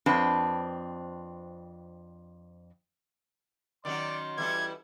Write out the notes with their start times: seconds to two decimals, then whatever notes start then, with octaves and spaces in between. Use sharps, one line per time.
0.06 F2 C4 D4 B4 A5
3.85 D#3 F#3 C#4 D5 C6
4.38 E3 G3 E4 A4 G#6